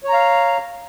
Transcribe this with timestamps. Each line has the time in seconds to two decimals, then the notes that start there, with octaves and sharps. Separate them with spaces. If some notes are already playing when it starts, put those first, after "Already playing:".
0.04 C#5
0.09 A#5
0.13 F5